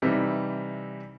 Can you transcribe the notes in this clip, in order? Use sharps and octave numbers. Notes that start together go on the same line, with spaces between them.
C3 E3 G3 C4 D#4